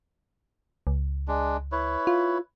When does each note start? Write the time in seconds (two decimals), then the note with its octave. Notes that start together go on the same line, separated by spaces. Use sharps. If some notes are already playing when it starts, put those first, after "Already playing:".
0.87 C#2
1.28 G#3 D4
1.72 E4 B4 C#5
2.07 F4